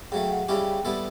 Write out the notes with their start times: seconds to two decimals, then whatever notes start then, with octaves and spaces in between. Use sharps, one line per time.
0.12 C#3 F#3 A3 G5
0.31 F#5
0.48 C#3 G3 C#4 E4 G4 G5
0.85 G3 B3 E4 A4